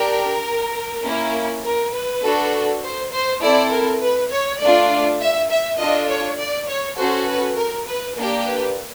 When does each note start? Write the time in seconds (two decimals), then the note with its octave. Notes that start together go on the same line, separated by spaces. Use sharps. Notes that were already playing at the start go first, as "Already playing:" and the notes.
Already playing: D4 G4 A#4
1.04 A#3 C#4 E4
1.64 A#4
1.94 B4
2.23 D4 F#4 A4
2.83 C5
3.12 C5
3.42 C4 E4 A4 D5
3.71 A#4
4.01 B4
4.31 C#5
4.60 A3 D4 F4 D5
5.20 E5
5.50 E5
5.79 D4 F4 A4 D#5
6.09 C#5
6.38 D5
6.68 C#5
6.98 C#4 F#4 A4 C5
7.28 B4
7.57 A#4
7.87 B4
8.16 A#3 D4 G4
8.46 B4